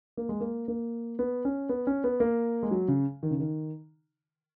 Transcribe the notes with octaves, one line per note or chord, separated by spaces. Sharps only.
A#3
G#3
A#3
A#3
B3
C#4
B3
C#4
B3
A#3
G#3
F#3
C#3
D#3
C#3
D#3